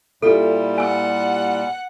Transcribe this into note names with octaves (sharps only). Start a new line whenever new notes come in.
A#2 G3 E4 F4 G4 A4
F#5 G#5 E6